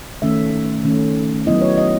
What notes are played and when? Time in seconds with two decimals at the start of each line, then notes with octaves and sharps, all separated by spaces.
0.22 D#3 A3 C#4 E5
0.84 D#3 A3 C#4
1.46 F#3 B3 E4 D#5
1.62 C#5
1.78 D#5